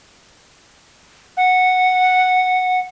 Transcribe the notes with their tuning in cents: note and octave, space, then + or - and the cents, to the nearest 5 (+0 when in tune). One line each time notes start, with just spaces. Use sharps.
F#5 -5